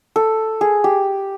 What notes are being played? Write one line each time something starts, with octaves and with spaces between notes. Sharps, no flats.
A4
G#4
G4